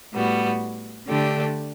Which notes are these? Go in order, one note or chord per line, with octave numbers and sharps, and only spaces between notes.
A2 G3 B3 F#4
D3 A3 D4 G4